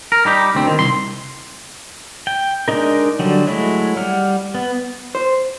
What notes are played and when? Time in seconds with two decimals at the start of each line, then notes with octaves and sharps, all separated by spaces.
0.12 A#4
0.25 G3 D#4 G4
0.55 D2 C4
0.67 D#3
0.79 C2 C6
2.27 G5
2.68 G#3 D4 D#4 A#4
3.19 D3 F#3 G3
3.47 F#3 G#3 A3 E4
3.97 G3 F#5 F6
4.55 B3
5.15 C5